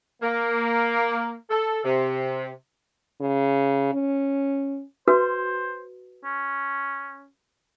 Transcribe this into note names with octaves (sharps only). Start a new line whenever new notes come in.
A#3
A4
C3
C#3
C#4
F#4 B4 C5
C#4